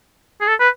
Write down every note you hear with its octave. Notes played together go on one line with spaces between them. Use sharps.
G#4
A4
B4